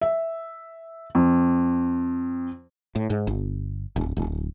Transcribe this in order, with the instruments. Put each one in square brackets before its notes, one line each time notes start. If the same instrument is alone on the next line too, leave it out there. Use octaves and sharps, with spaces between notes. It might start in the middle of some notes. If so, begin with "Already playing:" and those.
[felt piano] E5
F2
[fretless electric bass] A2
G#2
G1
D1
D1